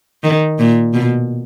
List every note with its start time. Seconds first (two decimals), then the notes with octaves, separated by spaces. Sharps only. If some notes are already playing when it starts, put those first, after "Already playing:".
0.24 D#3
0.59 A#2
0.94 B2